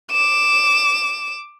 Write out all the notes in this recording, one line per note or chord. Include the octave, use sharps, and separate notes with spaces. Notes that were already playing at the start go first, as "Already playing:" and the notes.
D6 E7